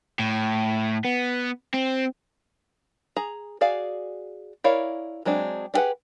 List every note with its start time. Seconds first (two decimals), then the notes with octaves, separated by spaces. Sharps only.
0.19 A2
1.05 B3
1.74 C4
3.16 G#4 A#5
3.61 F#4 G#4 D5 F5
4.64 E4 A#4 C#5 D5 F5
5.25 F#3 G#3 C4 D4
5.74 D4 G4 G#4 B4 F#5